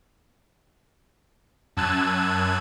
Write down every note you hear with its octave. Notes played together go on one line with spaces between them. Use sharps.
F#2 A5 E6 F#6 G#6 D#7